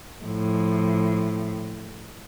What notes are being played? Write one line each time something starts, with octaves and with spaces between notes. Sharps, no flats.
A2 F3